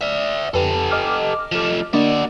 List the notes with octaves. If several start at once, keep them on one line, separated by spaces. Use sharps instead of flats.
D5 E5
F2 G4 A4 B4
D#5 D6 F6
F3 A3
A#3 D4 F#4 D5 D#5